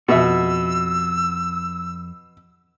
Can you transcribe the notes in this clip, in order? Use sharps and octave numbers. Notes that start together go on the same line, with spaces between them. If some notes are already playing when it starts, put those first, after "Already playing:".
F2 B2 F#4 E5 E6